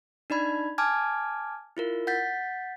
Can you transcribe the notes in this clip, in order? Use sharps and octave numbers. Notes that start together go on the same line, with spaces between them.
D4 D#4 D5 B5 G#6
G#5 A5 D6 F6 G#6
E4 F4 A#4
F#5 G6 A6 B6